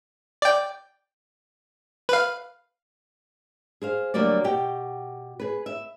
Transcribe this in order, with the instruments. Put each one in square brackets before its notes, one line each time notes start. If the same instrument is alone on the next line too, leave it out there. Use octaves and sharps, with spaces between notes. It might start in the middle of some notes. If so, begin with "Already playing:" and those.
[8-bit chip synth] D5 G5
B4 F5
[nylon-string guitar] G#4 C5 F5
D2 F#3 G3 A#3 D5
B2 G4 G5
G#4 B4
E5